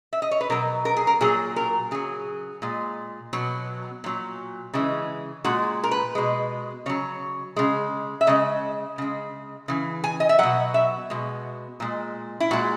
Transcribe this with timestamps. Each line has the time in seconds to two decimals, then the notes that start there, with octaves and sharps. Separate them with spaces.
0.13 E5
0.22 D#5
0.31 C#5
0.41 B4
0.50 B2 F#3 A#4
0.85 A#4
0.96 G#4
1.07 A#4
1.21 A#2 F#3 G#4
1.56 A#4
1.91 C#3 F#3 G#4
2.62 A#2 G#3
3.33 B2 F#3
4.04 A#2 F#3
4.74 C#3 E3 G#3
5.44 A#2 G#3 F#4
5.84 A#4
5.91 B4
6.15 B2 G#3
6.86 C#3 F#3 C#5
7.56 C#3 G#3
8.21 E5
8.27 C#3 G#3 D#5
8.98 C#3 G#3
9.68 C#3 E3
10.04 G#5
10.20 D#5
10.29 E5
10.39 B2 F#3 F#5
10.74 E5
11.10 B2 G#3
11.80 A#2 G#3
12.40 E4
12.51 A#2 G#3 F#4